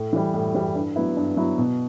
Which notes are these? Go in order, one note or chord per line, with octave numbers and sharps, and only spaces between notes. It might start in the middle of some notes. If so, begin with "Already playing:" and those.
Already playing: A2
E3 G3
A2
E3 G3
G2
F#3 B3 E4
G2
F#3 B3 E4
B2